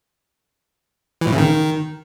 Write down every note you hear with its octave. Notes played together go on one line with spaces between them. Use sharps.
E3
A2
C#3
D#3